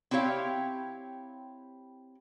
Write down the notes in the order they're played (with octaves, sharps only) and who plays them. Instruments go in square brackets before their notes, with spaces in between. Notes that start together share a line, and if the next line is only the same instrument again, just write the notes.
[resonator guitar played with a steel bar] C4 E4 G4 C#5 F5